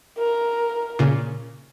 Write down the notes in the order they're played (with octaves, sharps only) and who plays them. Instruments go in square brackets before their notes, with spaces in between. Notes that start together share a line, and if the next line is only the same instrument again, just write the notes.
[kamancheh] A#4
[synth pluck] A#2 C#3